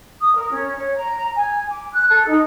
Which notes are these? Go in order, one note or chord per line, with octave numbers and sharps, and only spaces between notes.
D#6
A#4
C#4
C#5
A#5
G#5
D6
F#6
A4
D#4